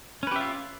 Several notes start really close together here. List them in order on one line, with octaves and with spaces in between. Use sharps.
C#4 B4 G4 E5 F4